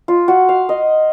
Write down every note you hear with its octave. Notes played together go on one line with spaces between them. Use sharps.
F4
F#4
F5
D#5